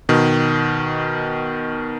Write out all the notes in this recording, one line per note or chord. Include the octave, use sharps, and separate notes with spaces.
B2 D#3